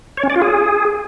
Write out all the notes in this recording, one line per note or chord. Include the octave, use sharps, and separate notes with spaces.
C#5
C#4
D5
F4
G#4